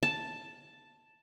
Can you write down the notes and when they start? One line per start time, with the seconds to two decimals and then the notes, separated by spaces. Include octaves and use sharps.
0.03 A5